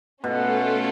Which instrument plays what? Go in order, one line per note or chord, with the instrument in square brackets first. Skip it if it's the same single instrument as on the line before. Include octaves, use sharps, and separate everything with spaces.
[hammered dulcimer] B2 [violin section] A3 C#4 F4 A4